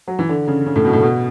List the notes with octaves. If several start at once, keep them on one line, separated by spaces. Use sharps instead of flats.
F#3
E3
D3
C#3
C#3
A2
B2
A2
B2